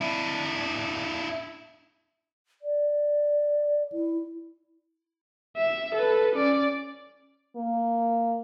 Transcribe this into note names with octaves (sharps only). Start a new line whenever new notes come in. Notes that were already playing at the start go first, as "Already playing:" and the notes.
D4 E4
D5
E4
E5
A4 B4
C#4 D5
A#3